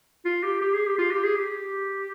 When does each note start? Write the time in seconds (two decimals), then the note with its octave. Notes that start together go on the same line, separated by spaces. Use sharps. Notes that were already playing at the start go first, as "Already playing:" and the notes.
0.25 F4
0.43 G4
0.61 G4
0.74 G#4
0.86 G4
0.98 F4
1.10 G4
1.23 G#4
1.36 G4